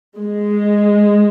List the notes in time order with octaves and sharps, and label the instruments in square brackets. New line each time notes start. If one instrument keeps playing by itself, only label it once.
[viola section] G#3